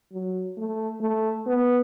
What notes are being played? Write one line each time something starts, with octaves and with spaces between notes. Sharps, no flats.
F#3
A3
A3
B3